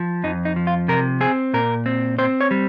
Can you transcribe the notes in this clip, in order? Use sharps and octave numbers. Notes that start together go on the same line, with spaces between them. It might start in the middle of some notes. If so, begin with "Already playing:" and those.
Already playing: F3
F2 D#4
D#4
F3
F4
C3 A#4
C4 G#4
A#2 A#4
C4
C4 C5
C#5
G3